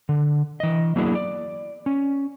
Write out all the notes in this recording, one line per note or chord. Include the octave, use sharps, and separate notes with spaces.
D3
E3 D#5
F#3 A#3 B3 D4 E4 G#4
D5
C#4